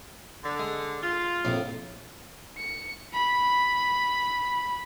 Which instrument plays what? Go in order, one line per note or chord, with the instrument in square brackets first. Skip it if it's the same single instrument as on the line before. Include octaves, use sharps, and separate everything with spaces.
[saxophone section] D3
[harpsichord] G#3
[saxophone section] F4
[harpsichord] A#1 F2 A2
[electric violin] C#7
B5